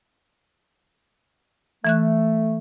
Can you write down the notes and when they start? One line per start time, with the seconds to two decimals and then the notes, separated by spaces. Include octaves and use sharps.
1.85 E3 A3 E5 F#6